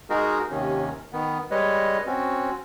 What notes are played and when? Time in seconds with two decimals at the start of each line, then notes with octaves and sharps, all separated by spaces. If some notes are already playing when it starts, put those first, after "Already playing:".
0.10 G#3 D#4 F#4 G#4 A#4
0.50 D#2 C3 D#3 C#4
1.13 D#3 B3
1.51 G3 G#3 B4 C#5 D#5
2.06 C4 C#4 F#4